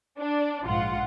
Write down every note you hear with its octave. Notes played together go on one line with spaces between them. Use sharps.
D4
A#1 G#2 F4 F#5